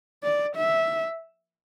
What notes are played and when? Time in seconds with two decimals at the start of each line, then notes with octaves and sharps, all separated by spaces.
0.23 D5
0.56 E5